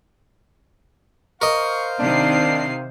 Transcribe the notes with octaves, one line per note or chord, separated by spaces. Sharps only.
A#4 C5 D#5 F5 C#6
C3 D#3 D4 C7